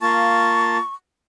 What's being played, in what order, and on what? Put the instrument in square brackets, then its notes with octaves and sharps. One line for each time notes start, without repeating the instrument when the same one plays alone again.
[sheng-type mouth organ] A#3 F4 A5 [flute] C#6